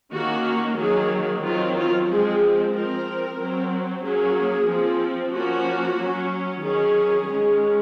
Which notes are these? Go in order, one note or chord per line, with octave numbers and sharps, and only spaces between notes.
D#3 A#3 C#4 F#4
D#3 F#3 A#3 G#4
D#3 F#3 C4 F4
F4
F3 G#3 C4 G#4
F3 C4 A#4
F#3 C4
F#3 A#3 C#4 G#4
F3 C4
F3 A#3 C#4 F#4
F#3 C#4
D#3 F#3 C#4 G#4
D#3 G#3 C#4